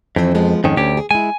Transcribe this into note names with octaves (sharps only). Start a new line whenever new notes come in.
F2 E3 F3 C4
F3 G#3 B3
F2 G#2 D#3 C#4
D2 C#4 G4
G#4
G#3 E4 G#5